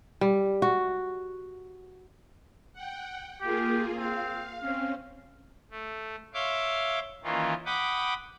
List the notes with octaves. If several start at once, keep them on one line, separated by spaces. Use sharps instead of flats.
G3
F#4
F#5 G5
A#3 F4 G4 G#4
C4 F5
C4 C#4 F5
A3
C#5 E5 F5 C6 D6
D#3 E3 A#3 C#4 F4
F#5 G5 B5 D6 D#6